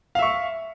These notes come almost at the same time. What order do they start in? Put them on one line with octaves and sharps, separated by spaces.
F5 E5 C#6